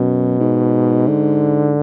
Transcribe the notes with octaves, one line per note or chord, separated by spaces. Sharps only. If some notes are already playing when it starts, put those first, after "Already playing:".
Already playing: F#2 B2
G#2
D3